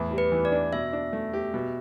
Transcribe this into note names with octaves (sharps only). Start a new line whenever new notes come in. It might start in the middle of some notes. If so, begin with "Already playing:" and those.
Already playing: E2 A2
G3
B4
E3
D5
D4
B2 E5
D4
A3
G4
B2